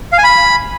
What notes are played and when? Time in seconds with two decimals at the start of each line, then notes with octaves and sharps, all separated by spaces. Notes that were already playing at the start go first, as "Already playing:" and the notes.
0.13 F5
0.18 G#5
0.24 B5